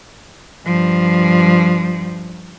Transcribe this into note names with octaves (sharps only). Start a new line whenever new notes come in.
G2 F3